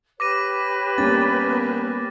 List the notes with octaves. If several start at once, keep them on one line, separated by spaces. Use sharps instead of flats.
G4 B4 C#5 D6 A#6 D#7
G3 A#3 B3 C#4 A6